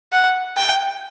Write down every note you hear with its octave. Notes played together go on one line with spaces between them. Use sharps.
F#5
G5